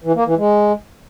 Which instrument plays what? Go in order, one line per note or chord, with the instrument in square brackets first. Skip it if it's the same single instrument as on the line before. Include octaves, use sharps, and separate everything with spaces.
[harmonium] E3
A#3
E3
G#3